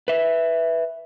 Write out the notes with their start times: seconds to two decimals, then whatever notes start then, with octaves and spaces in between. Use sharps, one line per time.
0.08 B4 E5